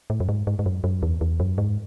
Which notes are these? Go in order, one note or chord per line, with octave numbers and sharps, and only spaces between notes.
A2
F#2
G#2
G#2
G#2
F#2
F#2
E2
E2
F#2
G#2